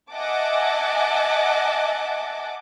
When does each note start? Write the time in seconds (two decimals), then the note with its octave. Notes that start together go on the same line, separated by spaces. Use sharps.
0.11 D#5 E5 F#5 G#5 A5 D6